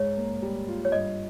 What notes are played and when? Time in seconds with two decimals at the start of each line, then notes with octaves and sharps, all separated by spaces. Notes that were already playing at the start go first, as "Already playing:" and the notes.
Already playing: G#2 C#5
0.17 A#3
0.42 G3
0.68 F4
0.85 C#5
0.92 G2 D#5